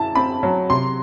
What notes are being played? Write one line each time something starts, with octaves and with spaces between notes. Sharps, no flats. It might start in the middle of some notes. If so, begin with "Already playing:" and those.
Already playing: F#2 E4 A5
C4 B5
F#3
C3 C6